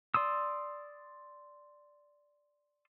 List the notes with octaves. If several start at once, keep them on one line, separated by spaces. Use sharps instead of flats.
D5 C6 D#6 E6